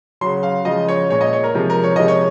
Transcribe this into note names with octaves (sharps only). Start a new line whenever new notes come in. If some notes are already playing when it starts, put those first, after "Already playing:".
C#3 F#3 C6
F5
C#3 F3 G#3 D#5
C#5
A#2 G#3 C#5
D#5
C#5
A#4
C3 F3 G#3 A#4
A#4
C#5
C3 F3 G#3 D#5
C#5